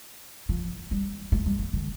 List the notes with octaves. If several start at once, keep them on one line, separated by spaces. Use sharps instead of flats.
F3
G3
A3
G3
F3
D3